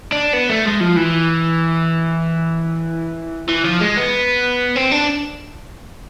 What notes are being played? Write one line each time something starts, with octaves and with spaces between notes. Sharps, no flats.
D4
B3
A3
G#3
F3
E3
E3
F3
G#3
B3
C4
D4